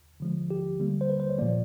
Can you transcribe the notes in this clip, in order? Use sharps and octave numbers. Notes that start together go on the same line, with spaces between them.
D3 F3 G#3
G4
D3 G3 A#3
C5
B4
C5
C#5
A#2 F3 A#3 D5